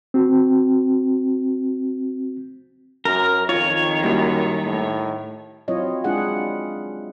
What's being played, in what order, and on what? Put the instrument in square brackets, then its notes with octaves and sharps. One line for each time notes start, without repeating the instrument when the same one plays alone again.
[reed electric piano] C4 F#4
[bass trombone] F#2 [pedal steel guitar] A#4
[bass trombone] F2 [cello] D#3 [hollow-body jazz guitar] F4 [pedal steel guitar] C#5
[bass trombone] F#2 [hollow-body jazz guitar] G3 A#3 E4
[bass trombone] A2
[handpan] F#3 C4 E4 F4 C#5 D#5
G#3 D4 E4 F4 G#4 F#5